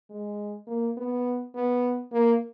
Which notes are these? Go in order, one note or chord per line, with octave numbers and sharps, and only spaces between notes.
G#3
A#3
B3
B3
A#3